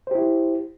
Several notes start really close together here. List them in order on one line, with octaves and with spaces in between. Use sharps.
C5 G4 E4